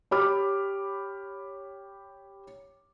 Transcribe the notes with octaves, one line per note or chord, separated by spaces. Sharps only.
G4 C#5 B5 D6 F6